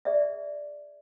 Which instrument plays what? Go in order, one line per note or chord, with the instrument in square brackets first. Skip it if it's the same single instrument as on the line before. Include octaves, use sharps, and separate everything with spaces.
[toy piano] G#4 D5 E5